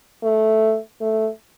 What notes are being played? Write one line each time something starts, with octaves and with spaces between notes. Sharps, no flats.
A3
A3